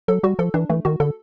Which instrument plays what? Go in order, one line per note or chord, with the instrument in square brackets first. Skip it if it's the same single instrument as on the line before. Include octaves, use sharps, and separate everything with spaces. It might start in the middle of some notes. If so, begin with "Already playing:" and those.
[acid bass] F#3 [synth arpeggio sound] A4
[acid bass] G3 [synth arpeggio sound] F#4
[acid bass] F3 [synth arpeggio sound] A4
[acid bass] E3 [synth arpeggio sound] D4
[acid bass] E3 [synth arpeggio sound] A3
[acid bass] D#3 [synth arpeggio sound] F#4
[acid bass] D3 [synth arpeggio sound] A4